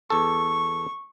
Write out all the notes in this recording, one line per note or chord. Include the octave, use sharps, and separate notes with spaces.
E2 A4 C#6